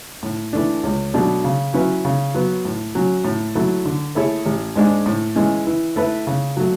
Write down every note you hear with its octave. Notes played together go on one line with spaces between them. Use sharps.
A2
E3 A3 D4
C#2
B2 F#3 A3 D4
C#3
F#3 C#4 E4 B4
C#3
F#3 B3
A2
F#3 C#4
A2
F#3 A3 E4
D3
A3 E4 G#4 C#5
A1
G#2 G#3 D4
A2
E3 G#3 C#4
E3
A3 E4 B4
C#3
F#3 A3